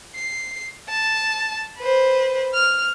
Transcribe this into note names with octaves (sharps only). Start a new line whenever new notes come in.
C7
A5
B4 C5
F6